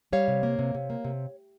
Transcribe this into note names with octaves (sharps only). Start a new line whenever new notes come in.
G3 C#5 F5
C3
A#3
C3
C3
A#3
C3